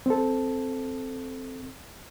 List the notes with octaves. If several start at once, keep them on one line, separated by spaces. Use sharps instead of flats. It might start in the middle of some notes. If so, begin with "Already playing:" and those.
C4 A4